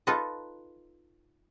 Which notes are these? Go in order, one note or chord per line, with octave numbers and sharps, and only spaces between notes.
D#4 F4 A4 B4 D#5